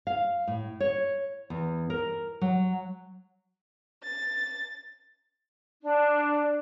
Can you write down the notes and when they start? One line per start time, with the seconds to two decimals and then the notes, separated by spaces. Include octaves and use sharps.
0.07 F5
0.47 A2
0.80 C#5
1.50 E2
1.90 A#4
2.41 F#3
4.03 A6
5.83 D4